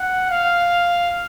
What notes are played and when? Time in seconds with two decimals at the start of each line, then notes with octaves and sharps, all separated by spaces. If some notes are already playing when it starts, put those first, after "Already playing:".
Already playing: F#5
0.29 F5